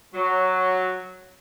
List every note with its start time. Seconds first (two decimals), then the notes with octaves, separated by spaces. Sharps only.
0.14 F#3